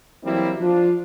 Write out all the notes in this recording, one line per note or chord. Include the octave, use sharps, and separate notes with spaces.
E3 F#3 G3 A#3 C4 E4
F3 D4 F4